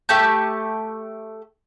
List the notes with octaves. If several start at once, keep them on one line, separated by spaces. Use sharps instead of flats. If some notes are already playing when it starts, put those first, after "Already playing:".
A3 G4 A5 G6